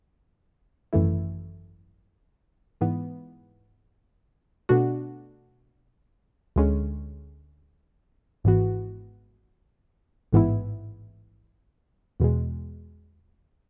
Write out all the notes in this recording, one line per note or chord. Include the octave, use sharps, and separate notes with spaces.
G#1 F#2 E3 A3 E4
G#2 E3 B3
B2 A3 D4 F#4
D2 D3 G#3 C#4
G#1 G#2 E3 B3 F#4
A1 G#2 E3 B3 E4
E2 B2 G#3